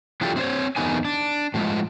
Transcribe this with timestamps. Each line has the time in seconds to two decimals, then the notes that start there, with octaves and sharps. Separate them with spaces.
0.21 E3 F#3 D4 F4 G4 A4
0.36 C4 E4 F4 C5 C#5
0.76 E2 D#3 A3 B3 D#4 G#5
1.05 D4
1.54 A2 F3 G3 G#3